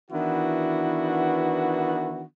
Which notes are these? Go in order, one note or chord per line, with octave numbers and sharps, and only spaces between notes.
D#3 E3 B3 D4 E4 F#4